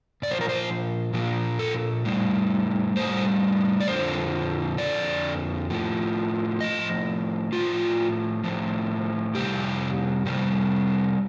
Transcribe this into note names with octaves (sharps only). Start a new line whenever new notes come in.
A#2 D5
F3 C5
A#4
C5
A#2 F3
A4
A2 G3
A2 G3 C5
D5
F2 D3 F3 C5
F2 D3 F3 D5
A2 F3
A2 F3 D#5
A2 F3 F4
A2 F3
F2 C3 G3 G4
F2 C3 G3